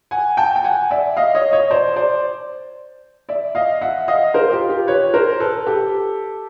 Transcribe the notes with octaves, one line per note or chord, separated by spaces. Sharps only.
F#5 G#5
G5 A5
G5
F#5 G#5
D5 E5
D#5 F5
C#5 D#5
C#5 D#5
C5 D5
C5 D5
D5 E5
D#5 F5
E5 F#5
D#5 F5
A#4 C5
F4 G4
F4 G4
B4 C#5
A#4 C5
A4 B4
G4 A4